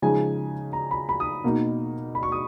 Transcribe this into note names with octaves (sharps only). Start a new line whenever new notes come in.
C#3 F3 G#3 D#4 G#5
A#5
B5
B5
D#6
B2 A#3 D#4
B5
C#6
D#6